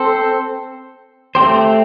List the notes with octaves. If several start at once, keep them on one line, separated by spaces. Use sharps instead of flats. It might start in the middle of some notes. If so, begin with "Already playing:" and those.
Already playing: C4 A4 C5
A3 C4 G4 C5